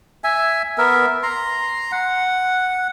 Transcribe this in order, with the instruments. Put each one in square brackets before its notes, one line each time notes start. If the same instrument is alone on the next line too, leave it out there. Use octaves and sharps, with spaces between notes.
[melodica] E5 G#5
B3 A#4 E5
A#5 C6
F#5